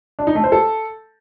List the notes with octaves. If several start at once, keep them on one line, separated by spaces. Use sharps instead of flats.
D4
D#4
A3
C5
A4